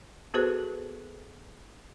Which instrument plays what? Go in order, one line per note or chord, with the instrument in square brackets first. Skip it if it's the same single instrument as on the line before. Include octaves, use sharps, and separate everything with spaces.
[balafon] B3 F#4 G#4 A4 B4 C5